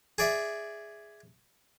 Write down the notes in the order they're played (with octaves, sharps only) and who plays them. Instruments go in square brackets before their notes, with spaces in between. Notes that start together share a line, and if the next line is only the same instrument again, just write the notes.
[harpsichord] G#4 D5 E5